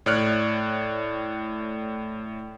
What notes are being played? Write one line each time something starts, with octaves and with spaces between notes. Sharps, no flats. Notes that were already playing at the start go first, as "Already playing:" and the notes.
A2 C#5 D5 F6 F#6